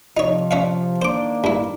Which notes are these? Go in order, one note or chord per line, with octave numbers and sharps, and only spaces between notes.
C3 F3 D#4 C#5
C#4 E5 F5
D#3 A#3 D4 C5 D6
G2 E4